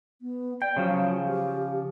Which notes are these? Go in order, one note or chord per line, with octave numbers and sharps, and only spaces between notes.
B3
D5 G5
C#3 F3 F#3
G4